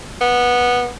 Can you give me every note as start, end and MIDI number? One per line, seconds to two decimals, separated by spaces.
0.21 0.89 59